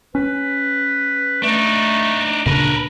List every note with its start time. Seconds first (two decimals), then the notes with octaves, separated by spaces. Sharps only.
0.15 C#4 B4
1.43 A3 D4 D#4
2.46 D2 A#2 C#3 D4 A#4 B4